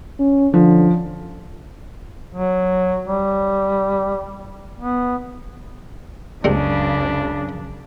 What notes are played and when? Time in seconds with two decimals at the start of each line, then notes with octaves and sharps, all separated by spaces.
0.19 C#4
0.54 D3 F3
2.35 F#3
3.07 G3
4.80 B3
6.44 C#2 F#2 C#3 G3 G#3 C4 D4